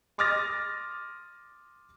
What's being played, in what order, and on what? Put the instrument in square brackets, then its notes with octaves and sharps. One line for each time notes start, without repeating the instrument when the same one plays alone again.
[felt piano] C6 D6 D#6 F6 A6 A#6